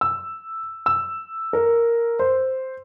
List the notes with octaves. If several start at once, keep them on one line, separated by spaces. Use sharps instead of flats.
E6
E6
A#4
C5